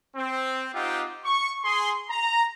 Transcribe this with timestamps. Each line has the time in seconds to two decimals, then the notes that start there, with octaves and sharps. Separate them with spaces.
0.16 C4
0.75 C4 D#4 F4 G4 F#5
1.24 C#6
1.64 G#4 C6
2.10 A#5